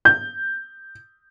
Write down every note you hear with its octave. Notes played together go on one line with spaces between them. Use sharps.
G6